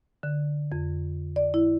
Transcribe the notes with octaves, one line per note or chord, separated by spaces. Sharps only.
D3
F2
D5
E4